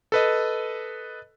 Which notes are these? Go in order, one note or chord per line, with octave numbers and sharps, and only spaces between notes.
A4 B4 D#5